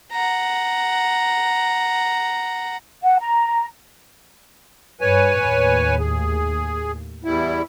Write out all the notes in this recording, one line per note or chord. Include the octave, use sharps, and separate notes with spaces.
F#5 A#5
F#5
A#5
G2 B4 C#5 G#5
D#2 A2
G#4
E2 G3 E4